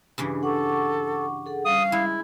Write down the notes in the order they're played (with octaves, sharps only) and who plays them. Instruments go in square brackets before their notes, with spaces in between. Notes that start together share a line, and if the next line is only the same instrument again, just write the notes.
[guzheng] G2 C#3 E3
[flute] A4 [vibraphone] F#5 C#6 D6
[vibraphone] G#4 A4 F#5
[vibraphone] G3 C#4 [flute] F5 [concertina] D#6
[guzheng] G#3 [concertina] E4